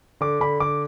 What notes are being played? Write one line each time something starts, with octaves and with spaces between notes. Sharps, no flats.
D3 D6
D3 B5
D3 D6